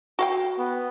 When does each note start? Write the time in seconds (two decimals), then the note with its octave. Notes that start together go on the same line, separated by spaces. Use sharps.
0.19 F#4 F5 G5
0.59 B3